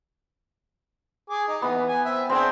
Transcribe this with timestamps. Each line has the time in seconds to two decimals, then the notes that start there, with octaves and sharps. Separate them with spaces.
1.30 G#4 D6
1.48 D#4
1.62 E3 B3
1.88 G#5
2.05 C4 E5
2.30 C4 D4 G#4 G5